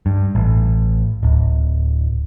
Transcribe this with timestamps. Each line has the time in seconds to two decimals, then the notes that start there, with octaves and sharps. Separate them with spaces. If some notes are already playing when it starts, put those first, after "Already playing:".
0.06 G2
0.35 A1
1.23 D1